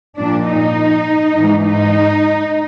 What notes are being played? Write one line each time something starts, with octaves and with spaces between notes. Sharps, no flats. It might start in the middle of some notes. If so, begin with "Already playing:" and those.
A#2 F3 D4
D#4
G#2 E3
D#4